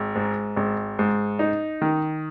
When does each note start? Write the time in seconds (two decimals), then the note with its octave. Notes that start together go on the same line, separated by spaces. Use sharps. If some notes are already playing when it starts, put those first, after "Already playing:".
Already playing: G#1
0.15 G#2
0.56 G#1
0.99 G#2
1.39 D#4
1.82 D#3